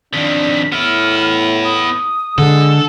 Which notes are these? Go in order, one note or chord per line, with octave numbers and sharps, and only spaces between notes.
F2 D#3 D4 B6
A2 B3 E4 F6
D#6
D3 G#3 A4